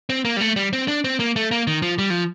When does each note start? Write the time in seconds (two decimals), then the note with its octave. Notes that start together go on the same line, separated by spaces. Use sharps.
0.10 C4
0.25 A#3
0.37 G3
0.41 A3
0.56 G3
0.73 C4
0.88 D4
1.04 C4
1.20 A#3
1.36 A3
1.51 A#3
1.67 D#3
1.82 F3
1.98 G3
2.10 F3